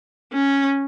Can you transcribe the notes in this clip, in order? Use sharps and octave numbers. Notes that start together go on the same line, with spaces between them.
C#4